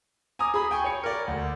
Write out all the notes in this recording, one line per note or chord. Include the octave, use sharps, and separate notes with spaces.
G#5 A#5 D6 D#6
G#4 B5
G5 G#5 C#6
C#5 C#7
A#4 D5
D2